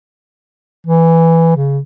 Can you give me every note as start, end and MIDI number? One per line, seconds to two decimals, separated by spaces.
0.87 1.55 52
1.56 1.79 49